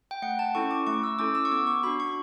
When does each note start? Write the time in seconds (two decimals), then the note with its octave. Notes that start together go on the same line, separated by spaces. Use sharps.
0.11 G5
0.22 A3 F#5
0.39 A5
0.55 C#4 E4 A4 C#6
0.71 D6
0.87 A3 C#6
1.03 E6
1.19 C#4 E4 A4 D6
1.35 E6
1.45 C#6
1.52 B3 D6
1.67 C#6
1.83 D4 F#4 B5
2.00 C#6